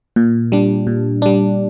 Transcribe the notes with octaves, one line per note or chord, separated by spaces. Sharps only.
A#2
G3 D4
A#2
G3 D4